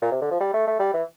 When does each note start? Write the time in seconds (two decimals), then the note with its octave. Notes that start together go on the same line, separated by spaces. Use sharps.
0.02 A#2
0.11 C3
0.21 D3
0.31 F3
0.41 G3
0.54 A3
0.67 A3
0.80 G3
0.93 E3